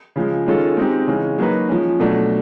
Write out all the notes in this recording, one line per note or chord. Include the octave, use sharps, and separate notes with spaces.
C#3 F3 G#3
D#3 G#3 C#4 F4 A4
G#3 C4 D#4 G4
C#3 E3 G#3 C#4
F#3 A#3 D#4 F#4 B4
F3 G#3 C#4
B2 F#3 A3 D4